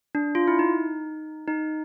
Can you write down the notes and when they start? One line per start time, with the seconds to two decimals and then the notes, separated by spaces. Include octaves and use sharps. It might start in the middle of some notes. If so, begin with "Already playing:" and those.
0.15 D4
0.35 F4
0.48 E4
0.59 D#4
1.48 D#4